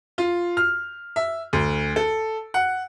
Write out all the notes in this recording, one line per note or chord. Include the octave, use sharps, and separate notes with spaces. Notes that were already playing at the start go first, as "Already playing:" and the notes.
F4
F6
E5
D2
A4
F#5